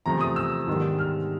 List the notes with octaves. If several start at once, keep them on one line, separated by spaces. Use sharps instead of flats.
E2 C3 F3 A3 A#5
D#6
E6
G#2 D#3 G3 B3 D4
F6